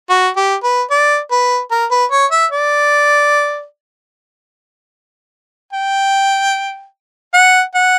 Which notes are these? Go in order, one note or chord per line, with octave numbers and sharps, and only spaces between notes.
F#4
G4
B4
D5
B4
A#4
B4
C#5
E5
D5
G5
F#5
F#5